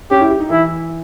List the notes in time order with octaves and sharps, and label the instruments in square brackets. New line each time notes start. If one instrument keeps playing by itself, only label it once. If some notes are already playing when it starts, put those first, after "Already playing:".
[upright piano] C#4 [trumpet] G4
[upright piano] E4
G4
D#4
[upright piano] E3 [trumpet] E4